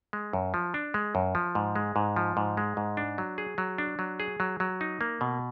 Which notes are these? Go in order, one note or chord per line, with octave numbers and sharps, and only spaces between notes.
G#3
F#2
F3
D4
G#3
F#2
F3
G#2
G#3
G#2
F3
G#2
G#3
G#2
D4
F#3
G#4
F#3
D4
F#3
G#4
F#3
F#3
D#4
A#3
B2